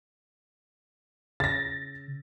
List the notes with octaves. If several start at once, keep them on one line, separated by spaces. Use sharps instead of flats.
C#3 A6 A#6